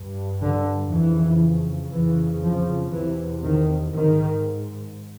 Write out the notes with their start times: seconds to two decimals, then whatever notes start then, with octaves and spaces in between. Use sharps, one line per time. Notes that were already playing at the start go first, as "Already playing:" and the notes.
Already playing: G2
0.41 D3
0.90 F2 C#3 E3
1.92 F2 C#3 E3
2.42 F3
2.92 E2 C3 E3
3.43 D#3
3.93 G#2 D#3